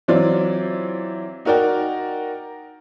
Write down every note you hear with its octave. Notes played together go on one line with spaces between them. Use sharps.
E3 F#3 C4 F4 D5
D#4 F#4 A#4 D5 G5